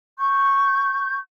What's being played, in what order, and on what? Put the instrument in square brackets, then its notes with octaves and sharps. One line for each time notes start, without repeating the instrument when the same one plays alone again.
[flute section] C#6 G6